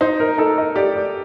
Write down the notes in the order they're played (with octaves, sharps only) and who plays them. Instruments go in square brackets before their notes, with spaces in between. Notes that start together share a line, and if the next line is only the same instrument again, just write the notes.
[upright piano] D#4 [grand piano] C5
[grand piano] A#4
[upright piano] D#4 [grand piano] A4
[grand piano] D#5
[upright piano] G4 [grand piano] D5
[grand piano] D5